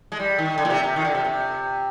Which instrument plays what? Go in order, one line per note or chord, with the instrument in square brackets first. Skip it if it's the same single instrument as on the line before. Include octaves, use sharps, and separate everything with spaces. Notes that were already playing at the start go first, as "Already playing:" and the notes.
[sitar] G#3
G3
D#3
D3
A#2
C3
C3
D#3
D3
C3
C3